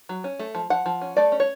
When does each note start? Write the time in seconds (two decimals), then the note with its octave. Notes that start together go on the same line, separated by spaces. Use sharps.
0.09 F#3
0.24 C#4
0.39 A3
0.55 F3
0.70 F3 F#5
0.86 F3
1.01 C#4
1.17 A3 D5
1.32 C#4
1.40 C#5